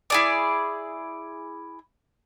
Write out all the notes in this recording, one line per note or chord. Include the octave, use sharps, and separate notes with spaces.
E4 G#4 D5